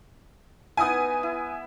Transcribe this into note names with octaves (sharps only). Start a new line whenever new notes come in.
B3 D#4 E4 G#5 D#6
E4